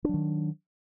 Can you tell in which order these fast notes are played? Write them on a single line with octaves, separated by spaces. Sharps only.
D4 F#3 D#3